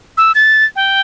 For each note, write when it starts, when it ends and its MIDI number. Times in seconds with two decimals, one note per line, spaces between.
0.17 0.32 88
0.35 0.65 93
0.76 1.01 79